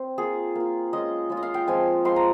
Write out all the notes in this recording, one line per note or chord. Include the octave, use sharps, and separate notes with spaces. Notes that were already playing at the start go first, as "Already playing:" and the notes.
Already playing: C4
A#3 F4 G#4
A#3 F4
G#3 C#4 F4 D#5
G#3 C#4 F4
D#5
F5
G5
F3 G#3 C4 G#5
F3 G#3 C4 C6
A#5